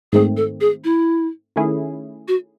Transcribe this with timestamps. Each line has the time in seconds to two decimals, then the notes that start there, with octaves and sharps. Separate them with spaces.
0.13 G#2 D#3 A3 C4 G#4
0.37 A4
0.61 G#4
0.84 E4
1.56 D#3 A3 C#4 E4 G#4
2.28 F#4